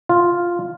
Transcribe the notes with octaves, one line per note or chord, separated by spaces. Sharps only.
F4